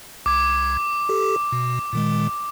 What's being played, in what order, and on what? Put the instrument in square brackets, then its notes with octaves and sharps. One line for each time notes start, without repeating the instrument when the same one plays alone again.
[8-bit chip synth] C2 G#6 [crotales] D6
[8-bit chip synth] G4 A4
B2
A#2 D#3 G#3